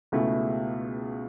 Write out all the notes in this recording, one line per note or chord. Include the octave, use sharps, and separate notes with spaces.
C#2 B2 A3 E4 G#4